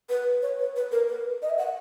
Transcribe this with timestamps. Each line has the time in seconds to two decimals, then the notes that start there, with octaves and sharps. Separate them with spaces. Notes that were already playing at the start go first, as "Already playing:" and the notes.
0.09 B4
0.42 C#5
0.59 B4
0.76 B4
0.92 A#4
1.08 B4
1.42 D#5
1.50 E5
1.58 F#5